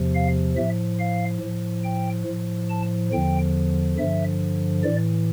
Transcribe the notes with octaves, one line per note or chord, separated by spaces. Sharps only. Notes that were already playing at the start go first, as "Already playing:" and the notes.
Already playing: E2 C3 F3
F5
A2 F3 E5
F5
A2 F3
G5
A2 F3
A5
E2 D3 F3 G5
G2 D3 F3 E5
A2 E3 D5